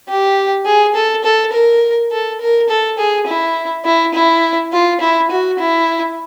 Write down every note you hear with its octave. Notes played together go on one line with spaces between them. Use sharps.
G4
G#4
A4
A4
A#4
A4
A#4
A4
G#4
E4
E4
E4
F4
E4
F#4
E4